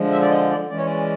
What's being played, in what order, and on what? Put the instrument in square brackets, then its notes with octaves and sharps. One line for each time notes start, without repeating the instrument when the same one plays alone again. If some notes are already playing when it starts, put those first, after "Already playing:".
Already playing: [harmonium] D3 F3 G#3
E5
D5
D#5
D5
E3 G#3 C#4 D5
C#5
D5